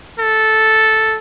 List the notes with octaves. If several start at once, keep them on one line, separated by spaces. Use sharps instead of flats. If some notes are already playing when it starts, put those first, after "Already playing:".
A4